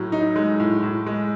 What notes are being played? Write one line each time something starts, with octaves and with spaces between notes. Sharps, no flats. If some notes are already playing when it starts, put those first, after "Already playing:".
Already playing: A2 F#3
D#4
G#3
A2
A2
G#3